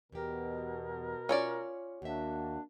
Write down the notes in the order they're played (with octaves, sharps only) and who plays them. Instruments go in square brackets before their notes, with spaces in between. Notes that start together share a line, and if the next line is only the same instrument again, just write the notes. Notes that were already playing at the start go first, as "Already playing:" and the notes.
[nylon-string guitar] E2 G4 [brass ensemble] B2 [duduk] A#4
[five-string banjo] C#4 C#5 D5 [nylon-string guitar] F4
[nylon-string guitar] D#2 E5 [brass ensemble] A#3 F#4 [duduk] D4